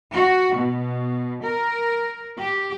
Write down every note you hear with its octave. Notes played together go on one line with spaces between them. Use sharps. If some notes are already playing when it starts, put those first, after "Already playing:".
F#4
B2
A#4
G4